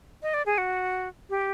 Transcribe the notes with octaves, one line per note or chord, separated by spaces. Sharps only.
D#5
D5
G#4
F#4
G4